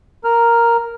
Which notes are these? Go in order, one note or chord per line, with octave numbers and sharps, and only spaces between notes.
A#4 F6